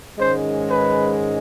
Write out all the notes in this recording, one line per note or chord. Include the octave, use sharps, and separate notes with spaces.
G#2 D#3 G#3 C#4 C5
B4